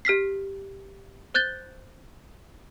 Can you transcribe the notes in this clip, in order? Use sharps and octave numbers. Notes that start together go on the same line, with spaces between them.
G4 F6 B6 C7
C5 F#6 G6 A6 G7